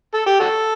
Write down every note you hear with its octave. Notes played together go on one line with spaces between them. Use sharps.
A4
G4
F#4 A4